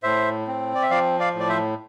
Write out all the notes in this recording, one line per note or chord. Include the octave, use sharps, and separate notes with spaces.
A2 C5 E5
C4
D5
E5
F3 D5 F5
D5 F5
A2
D5
C5 E5